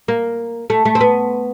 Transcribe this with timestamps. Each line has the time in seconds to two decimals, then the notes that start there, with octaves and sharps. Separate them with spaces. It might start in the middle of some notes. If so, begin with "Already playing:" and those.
0.08 A#3
0.70 A3
0.85 A3
0.95 C4
1.01 B3